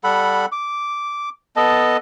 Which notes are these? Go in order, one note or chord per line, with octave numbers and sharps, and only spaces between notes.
G3 A4 F#5 B5
D6
B3 A4 D#5 A5